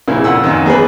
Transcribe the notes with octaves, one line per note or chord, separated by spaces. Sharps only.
A#1 C#3 A#3 E4
F2 A#2 F#5 E6
F#2 D#3
E2 G#4 B4